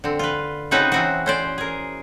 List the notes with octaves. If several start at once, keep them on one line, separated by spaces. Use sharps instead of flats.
D3 C4
F4 B4
C#3 C4 D#4 F#4 G#4 B4
E3 C4 F#4
C#4 C5 D5
G#4 A#4